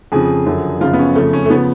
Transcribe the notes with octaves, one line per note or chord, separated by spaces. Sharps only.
F2 C#3 F3 G#4
F#2 D3 F3
F#2 C#3 F3 F4
B3
C#4
F2 C#3 F3 A3
C#4
A3
C#3 F3 B3